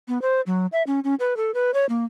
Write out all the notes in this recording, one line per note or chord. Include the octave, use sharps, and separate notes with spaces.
B3
C5
F#3
E5
C#4
C#4
B4
A4
B4
C#5
A#3